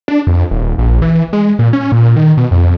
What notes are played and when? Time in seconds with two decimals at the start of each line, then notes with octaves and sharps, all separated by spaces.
0.08 D4
0.27 F2
0.51 D#1
0.78 A#1
1.02 E3
1.33 G#3
1.59 A#2
1.73 C#4
1.92 A#2
2.16 D#3
2.37 B2
2.51 F2